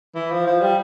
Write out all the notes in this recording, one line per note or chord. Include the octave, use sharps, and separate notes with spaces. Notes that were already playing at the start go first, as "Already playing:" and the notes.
E3
F3
F3
G3